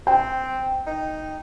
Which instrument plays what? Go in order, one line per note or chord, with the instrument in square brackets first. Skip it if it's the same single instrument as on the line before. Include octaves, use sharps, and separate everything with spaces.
[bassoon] C4 [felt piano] G5
[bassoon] D#4